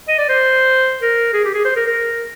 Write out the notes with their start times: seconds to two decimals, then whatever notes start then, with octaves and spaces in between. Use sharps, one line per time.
0.08 D#5
0.18 D5
0.29 C5
1.02 A#4
1.33 G#4
1.45 G4
1.54 G#4
1.65 C5
1.76 A#4
1.86 A#4